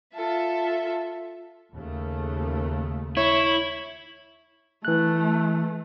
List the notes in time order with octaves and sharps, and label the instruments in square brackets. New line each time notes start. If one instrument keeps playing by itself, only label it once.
[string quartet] F4 A4 E5
[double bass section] D#2 C#3 A3
[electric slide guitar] E4 [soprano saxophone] C#5
[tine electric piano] E3 F#6 [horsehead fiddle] A3